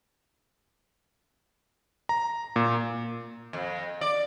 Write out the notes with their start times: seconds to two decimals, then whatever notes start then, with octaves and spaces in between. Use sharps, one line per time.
2.09 A#5
2.56 A#2
3.53 F2
4.01 D5